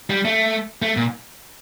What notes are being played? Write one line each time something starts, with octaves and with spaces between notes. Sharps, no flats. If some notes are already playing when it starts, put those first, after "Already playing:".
G3
A3
A3
A#2